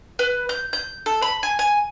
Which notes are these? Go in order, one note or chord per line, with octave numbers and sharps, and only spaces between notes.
B4
G6
G6
A4
B5
G#5
G#5